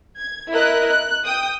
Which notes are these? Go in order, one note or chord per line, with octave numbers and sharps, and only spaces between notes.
G#6
E4 A#4 D#5 F#6
F#6
G5 D#6